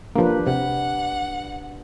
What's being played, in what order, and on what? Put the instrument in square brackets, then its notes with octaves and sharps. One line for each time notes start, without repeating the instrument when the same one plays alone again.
[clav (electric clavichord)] F3 A#3 [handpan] D4 G4 B4
[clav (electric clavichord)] C3 [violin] F#5